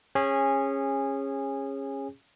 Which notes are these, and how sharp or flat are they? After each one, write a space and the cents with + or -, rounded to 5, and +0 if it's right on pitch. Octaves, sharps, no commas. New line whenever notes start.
C#4 -20 G#4 -20